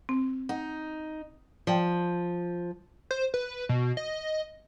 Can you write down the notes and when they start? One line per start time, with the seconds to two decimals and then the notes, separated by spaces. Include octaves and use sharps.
0.09 C4
0.49 D#4 F#5
1.67 F3 D5 G5
3.11 C5
3.34 B4
3.69 B2
3.97 D#5